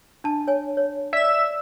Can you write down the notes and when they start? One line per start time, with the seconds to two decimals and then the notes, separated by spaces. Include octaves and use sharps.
0.24 D4 A5
0.48 C#5 G#5
0.77 C#5
1.13 D5 E5 E7